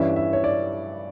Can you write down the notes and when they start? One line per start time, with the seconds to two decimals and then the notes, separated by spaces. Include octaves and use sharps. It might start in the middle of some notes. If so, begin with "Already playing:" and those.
Already playing: G2 E3 G3 C#4 E5
0.16 E5
0.33 C#5
0.44 D5